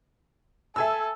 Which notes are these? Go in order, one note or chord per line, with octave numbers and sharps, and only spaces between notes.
A4 E5 G#5 E6